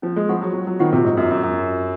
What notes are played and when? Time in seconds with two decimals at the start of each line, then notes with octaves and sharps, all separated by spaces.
0.02 F3 C#4
0.16 G#3
0.29 F3 F4 C5 F#5 C#6
0.41 F#3
0.53 F#3 C#4
0.67 F#3
0.79 D#3 F4 C5 F#5 C#6
0.93 C3
1.04 G#2 F4
1.17 F#2
1.30 F#2 G#4 D#5
1.43 F#2
1.56 F4